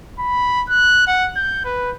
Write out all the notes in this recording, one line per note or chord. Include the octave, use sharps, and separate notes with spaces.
B5
F#6
F#5
G6
B4